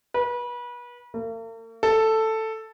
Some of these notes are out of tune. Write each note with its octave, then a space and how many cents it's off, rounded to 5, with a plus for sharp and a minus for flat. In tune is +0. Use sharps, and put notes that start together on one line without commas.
B4 -30
A#3 -45
A4 +5